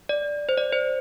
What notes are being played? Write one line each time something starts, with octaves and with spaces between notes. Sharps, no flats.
D5
C5
D5
C5